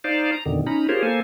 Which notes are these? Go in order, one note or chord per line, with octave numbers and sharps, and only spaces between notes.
D#4 C5 D5 F5
A#5
F2 B2 D3 D#3
C#4 D#4 A#5 B5
F4 G4 G#4 A#4 C5 C#5
A#3 A4 C5 G#5